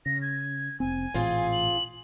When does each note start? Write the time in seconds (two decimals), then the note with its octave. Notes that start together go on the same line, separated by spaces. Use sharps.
0.06 C#3 A#6
0.22 G#6
0.80 F1 C4 G#5
1.14 A1 A#2 C4 F4 G#4
1.52 F#7